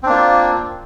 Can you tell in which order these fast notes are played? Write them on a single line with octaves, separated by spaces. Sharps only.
C4 D4 A#3 F4